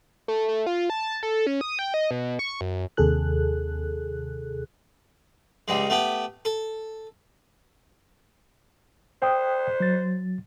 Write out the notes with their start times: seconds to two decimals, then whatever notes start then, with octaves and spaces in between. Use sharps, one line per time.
0.28 A3
0.48 A3
0.66 F4
0.90 A5
1.23 A4
1.47 C#4
1.61 D#6
1.79 G5
1.94 D#5
2.11 B2
2.39 C#6
2.61 F#2
2.97 D#2 C3 G#4 A4 F#6
5.68 C#2 G3 G#3
5.90 A3 B3 G4
6.45 A4
9.22 C5 G5 D#6
9.80 F#3 A6